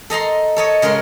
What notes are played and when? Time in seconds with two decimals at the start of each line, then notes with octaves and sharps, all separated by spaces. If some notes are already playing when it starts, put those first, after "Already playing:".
0.10 A4 D#5 A#5 C6
0.56 A4 C#5 D#5
0.82 C#3 G#3 A#4 C6